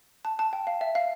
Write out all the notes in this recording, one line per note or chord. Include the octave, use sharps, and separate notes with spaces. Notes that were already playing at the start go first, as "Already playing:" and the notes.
A5
A5
G5
F5
E5
F5